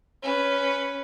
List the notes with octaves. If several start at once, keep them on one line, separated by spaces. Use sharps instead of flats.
C#4 B4